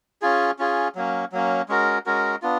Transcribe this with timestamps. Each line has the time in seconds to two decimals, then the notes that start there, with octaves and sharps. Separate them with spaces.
0.22 C#4 F4 G#4
0.59 C#4 F4 G#4
0.95 F#3 A#3 C#4
1.32 F#3 A#3 C#4
1.69 G#3 C#4 F#4 A#4
2.06 G#3 C#4 F#4 A#4
2.42 B3 D4 F4